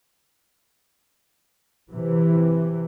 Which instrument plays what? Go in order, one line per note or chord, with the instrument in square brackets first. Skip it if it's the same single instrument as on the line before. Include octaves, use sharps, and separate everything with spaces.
[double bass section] C3 E3